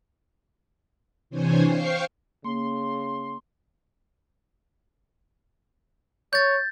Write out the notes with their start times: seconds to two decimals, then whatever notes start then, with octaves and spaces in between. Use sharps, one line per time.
1.30 C3 E3 D4 C5 C#5 G#5
1.66 C5 F5 G5 C6 C#6
2.45 C#3 A#3 C6
6.33 C#5 G6 A6